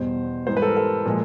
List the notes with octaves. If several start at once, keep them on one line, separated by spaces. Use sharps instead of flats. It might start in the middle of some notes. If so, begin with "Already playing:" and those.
Already playing: E2 B2 G3 C5
G#2 E3 G3 C5
B4
A4
A#4
A4
A#2 F3 G#3